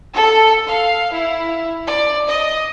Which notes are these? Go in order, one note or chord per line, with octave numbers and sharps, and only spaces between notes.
A4
F5
E4
D5
D#5